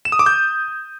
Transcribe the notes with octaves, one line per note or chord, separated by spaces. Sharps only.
E7
D#6
D6
G6